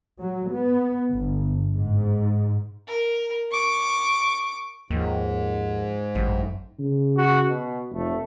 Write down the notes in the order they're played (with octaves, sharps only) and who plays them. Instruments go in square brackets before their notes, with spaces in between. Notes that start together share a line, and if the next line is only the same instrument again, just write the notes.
[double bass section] F#3
B3
G1
G#2
[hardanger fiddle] A#4
C#6 D6
[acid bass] D#2 [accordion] G#2 [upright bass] F3
[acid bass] A1 [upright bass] F#2
[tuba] C#3
[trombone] F#4
B2
[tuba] F1 [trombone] A3